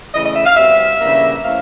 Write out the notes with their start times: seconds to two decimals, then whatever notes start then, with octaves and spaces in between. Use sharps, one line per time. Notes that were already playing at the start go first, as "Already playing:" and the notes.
0.14 C#3 E3 A3 D#5
0.25 D#5
0.36 E5
0.46 F5
0.57 B2 G3 C4 E5
1.00 C#3 E3 G3 A#3 D4
1.43 C3 E3 A3 C#4 F5